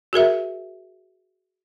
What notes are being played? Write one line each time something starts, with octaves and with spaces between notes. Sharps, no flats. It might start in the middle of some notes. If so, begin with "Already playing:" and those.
F#4 G#4 A#4 E5